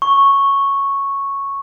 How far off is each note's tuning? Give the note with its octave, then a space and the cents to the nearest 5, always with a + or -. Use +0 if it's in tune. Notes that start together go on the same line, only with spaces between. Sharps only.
C#6 -5